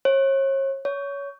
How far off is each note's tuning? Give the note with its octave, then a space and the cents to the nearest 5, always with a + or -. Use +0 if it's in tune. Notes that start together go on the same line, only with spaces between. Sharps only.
C#5 -40
C#5 +20